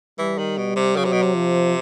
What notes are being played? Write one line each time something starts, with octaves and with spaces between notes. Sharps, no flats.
E3 G3
D#3
B2
C3
C#3 F#3
C3
B2
C3
F3